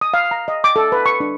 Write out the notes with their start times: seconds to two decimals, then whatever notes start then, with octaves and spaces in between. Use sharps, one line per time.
0.01 D#6
0.14 F5
0.31 A#5
0.48 D#5
0.64 D6
0.76 A4
0.92 B4
1.06 C#6
1.20 D4